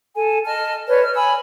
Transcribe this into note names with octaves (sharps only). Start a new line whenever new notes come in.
A4 G#5
D#5 A5 F6
B4 C#5 D5
F6
G#5 B5 E6